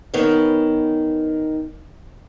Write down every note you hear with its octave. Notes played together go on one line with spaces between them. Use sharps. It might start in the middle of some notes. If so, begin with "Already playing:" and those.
D#3 B3 C#4